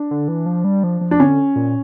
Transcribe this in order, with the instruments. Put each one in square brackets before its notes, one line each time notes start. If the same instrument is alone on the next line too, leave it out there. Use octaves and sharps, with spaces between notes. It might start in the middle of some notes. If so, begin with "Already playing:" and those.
Already playing: [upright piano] D4
[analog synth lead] D3
E3
F3
G3
F3
F3
[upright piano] D4
[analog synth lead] D3 [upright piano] C#4
[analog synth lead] A#2